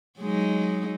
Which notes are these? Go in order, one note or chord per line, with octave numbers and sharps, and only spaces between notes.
F#3 G#3 D#4